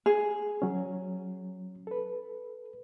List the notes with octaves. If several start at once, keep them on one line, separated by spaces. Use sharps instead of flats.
G#4
F#3 C#4
A4 B4